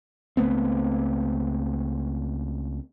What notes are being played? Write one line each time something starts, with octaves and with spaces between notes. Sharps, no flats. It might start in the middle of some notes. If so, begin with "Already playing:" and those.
C#2 A3 B3 C4